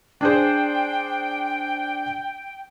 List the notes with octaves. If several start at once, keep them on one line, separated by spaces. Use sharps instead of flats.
D4 G#4 C5 G5